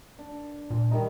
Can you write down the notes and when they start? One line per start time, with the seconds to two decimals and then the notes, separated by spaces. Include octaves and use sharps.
0.19 D4
0.70 A#2
0.91 D#3 G3 D#4